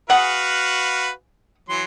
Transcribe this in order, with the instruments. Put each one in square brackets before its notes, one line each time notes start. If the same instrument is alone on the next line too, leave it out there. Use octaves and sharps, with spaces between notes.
[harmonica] F#4 B4 F5 [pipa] G#4 F#5
[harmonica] E3 F#3 C6